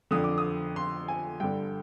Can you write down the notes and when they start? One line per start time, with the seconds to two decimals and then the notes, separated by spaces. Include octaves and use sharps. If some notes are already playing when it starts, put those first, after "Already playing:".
0.11 F2 D3 D#6
0.24 D6
0.38 D#6
0.76 C6
1.08 G#5
1.40 G2 D3 G5